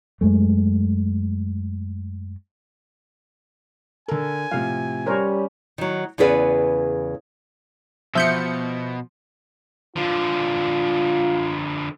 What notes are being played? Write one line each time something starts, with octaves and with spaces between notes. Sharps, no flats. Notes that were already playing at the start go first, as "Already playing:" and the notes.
F#2 G#3 A3
D3 A4 A#4 G#5
A2 C3 F3 F5
G3 C#4 A#4 C5 C#5
D#3 F#3
E2 C#3 B3 G#4 B4 D5
B2 F3 E5 G6 C#7
D3 F3 F4